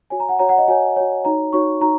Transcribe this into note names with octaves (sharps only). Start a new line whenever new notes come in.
F#4 C#5 G#5
A#5
F#5
F#4 C#5 A#5
F#5
D#5
F#4 C#5 G#5
F#4 C#5
D#4 F#4 C#5 A#5
D#4 F#4 C#5 C#6
D#4 F#4 A#5